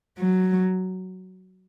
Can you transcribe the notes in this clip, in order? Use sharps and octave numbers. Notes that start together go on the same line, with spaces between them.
F#3